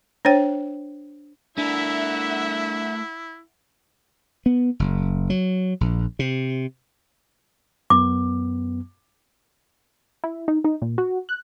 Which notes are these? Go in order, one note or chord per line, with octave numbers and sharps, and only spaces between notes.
D4 C5 C#5 G5
A3 D4 E4 A#4 E5 F#5
B3
F#1
F#3
A#1
C3
F#2 B3 D6
E4
D#4
D#4
A#2
F#4
F#6